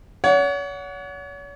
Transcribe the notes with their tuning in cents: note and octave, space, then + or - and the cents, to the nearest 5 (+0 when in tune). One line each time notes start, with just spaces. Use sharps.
C#5 +40 F#5 -5